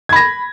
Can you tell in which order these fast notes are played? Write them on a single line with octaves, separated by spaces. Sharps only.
G#6 B5 A#6